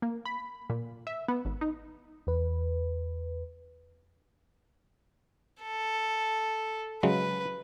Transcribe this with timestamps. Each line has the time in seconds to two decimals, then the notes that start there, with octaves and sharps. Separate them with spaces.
0.02 A#3
0.25 B5
0.70 A#2
1.07 E5
1.28 B3
1.45 G#1
1.61 D#4
2.27 E2 B4
5.62 A4
7.03 C#3 F#3 G#3 B4